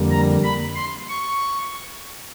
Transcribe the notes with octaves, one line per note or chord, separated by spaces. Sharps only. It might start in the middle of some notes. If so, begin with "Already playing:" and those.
Already playing: F2 D3 G3 A#3
A#5
B5
C6
C#6